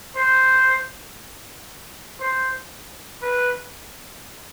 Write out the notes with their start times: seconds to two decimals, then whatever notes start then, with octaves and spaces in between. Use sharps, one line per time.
0.15 C5
2.20 C5
3.22 B4